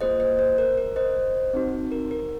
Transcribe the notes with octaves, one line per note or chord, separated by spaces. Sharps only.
A#3 F4 G#4 C5 D#5
C5 D#5
C5
A#4
A#4
C5 D#5
C4 D#4 F#4
A#4
A#4